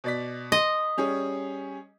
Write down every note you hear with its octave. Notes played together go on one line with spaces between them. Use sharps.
B2 D5 B6
D#5 C6
G3 C#4 G#4